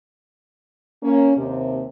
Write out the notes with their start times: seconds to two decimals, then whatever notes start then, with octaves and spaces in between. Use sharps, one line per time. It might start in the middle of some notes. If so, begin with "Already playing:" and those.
1.03 A#3 C#4
1.37 D#2 C3